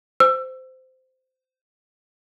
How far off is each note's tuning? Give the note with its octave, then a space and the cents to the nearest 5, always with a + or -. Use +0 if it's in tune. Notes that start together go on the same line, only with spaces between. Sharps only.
C5 -15 E6 +25